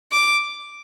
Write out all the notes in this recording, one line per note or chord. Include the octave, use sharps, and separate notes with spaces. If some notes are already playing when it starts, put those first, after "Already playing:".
D6